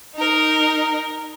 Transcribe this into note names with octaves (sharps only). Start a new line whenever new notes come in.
D#4 A#4